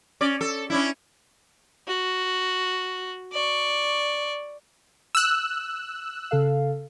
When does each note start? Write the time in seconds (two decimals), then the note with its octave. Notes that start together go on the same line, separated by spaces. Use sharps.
0.21 C#4 D5
0.41 A4
0.70 C#4 D4 E4
1.87 F#4
3.32 D5 C#6
5.15 E6 F#6
6.31 C#3 A4 F5